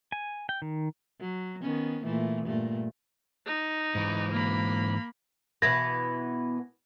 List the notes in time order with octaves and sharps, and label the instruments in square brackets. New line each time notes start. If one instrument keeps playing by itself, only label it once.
[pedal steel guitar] G#5
G5
D#3
[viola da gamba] F#3
D#3 B3 C#4
A#2 E3 A3
G2 A#2 A3
[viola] D#4
[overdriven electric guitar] G#2 E3
[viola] A#3 B5
[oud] B2 E3 B3 [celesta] G#6 A#6